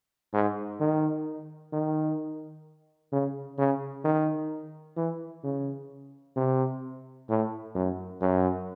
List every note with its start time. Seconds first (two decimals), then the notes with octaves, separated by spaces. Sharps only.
0.34 G#2
0.80 D#3
1.73 D#3
3.13 C#3
3.58 C#3
4.05 D#3
4.97 E3
5.44 C#3
6.36 C3
7.29 A2
7.75 F#2
8.21 F#2